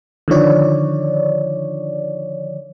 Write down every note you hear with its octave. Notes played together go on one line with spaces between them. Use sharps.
D3 D#3 F3 C#5 D5